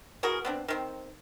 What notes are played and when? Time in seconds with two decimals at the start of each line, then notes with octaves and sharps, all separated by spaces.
0.23 E3 F#4 G#4 A#4
0.45 B3 C4 D4
0.68 D#3 C4